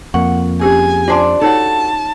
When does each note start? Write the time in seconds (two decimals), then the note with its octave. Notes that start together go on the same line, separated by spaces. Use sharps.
0.14 F2 A#3 F#5 C#6
0.61 C#4 G4 G#4 G#5 E6
1.08 D4 F4 C5 D5 A5 C6
1.41 D#4 F#4 A4 C#5 A5